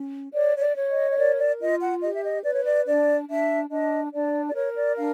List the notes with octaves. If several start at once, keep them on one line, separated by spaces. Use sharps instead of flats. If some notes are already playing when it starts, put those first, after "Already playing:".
Already playing: C#4
C#5 D5
C#5
D5
C#5
D#5
D#5
A#4 D5
D5
F4 D#5
F#5
G4 D#5
E5
D#5
B4 D5
C#5
D5
D4 D5
D4 E5
D4 D#5
D4 D5
D5
A#4 C#5
D5
D4 F5